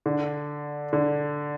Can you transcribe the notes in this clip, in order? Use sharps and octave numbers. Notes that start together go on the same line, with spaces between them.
D3
D3